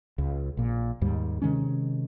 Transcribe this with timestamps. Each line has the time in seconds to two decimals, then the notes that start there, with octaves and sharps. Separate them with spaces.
0.18 C#2
0.57 A#1 A#2
1.01 D#2 G#2 G3
1.42 C3 D#3 G#3 C#4